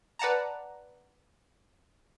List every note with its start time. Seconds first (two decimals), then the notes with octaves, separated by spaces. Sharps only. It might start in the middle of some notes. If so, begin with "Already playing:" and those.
0.19 B4 D5 F#5 A5 A#5